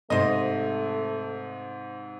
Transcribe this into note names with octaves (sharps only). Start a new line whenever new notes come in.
G#2 C3 A3 C5 D#5